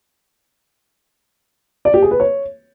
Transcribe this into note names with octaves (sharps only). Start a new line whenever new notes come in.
D5
G4
G#4
B4
C#5